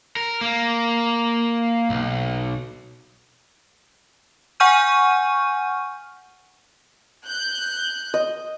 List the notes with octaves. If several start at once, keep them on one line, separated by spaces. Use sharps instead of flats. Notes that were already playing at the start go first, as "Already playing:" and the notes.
A#4
A#3
B1
F#5 G#5 C#6 F6 G6 D#7
F#6 G6
D#5